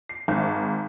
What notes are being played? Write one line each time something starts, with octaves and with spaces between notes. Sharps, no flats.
C7
G#1